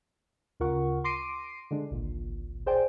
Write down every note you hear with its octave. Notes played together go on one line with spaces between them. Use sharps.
D2 C#3 F4 A#4 F#5 C#6
C6 D6 A#6 C7 D7 D#7
D3 G#3 D4
G#1 C#2 A#2
G#4 C5 D5 G5 G#5